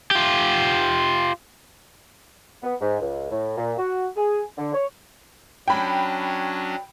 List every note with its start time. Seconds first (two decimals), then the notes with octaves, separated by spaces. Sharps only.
0.11 F4 G4
2.63 B3
2.81 G#2
3.00 C#2
3.31 A2
3.58 A#2
3.78 F#4
4.17 G#4
4.58 D3
4.74 C#5
5.68 F#3 C#4 D4 G5 B5